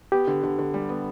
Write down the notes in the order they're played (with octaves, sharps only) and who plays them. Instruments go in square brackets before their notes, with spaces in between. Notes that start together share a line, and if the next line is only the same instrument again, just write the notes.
[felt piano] B3 [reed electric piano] G4
[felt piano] D3
D3
D3
G3
B3